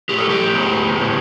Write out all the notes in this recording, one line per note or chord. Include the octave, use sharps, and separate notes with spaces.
A2 G4
A4
G4
B3
A2